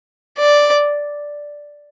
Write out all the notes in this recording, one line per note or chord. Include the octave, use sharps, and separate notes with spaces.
D5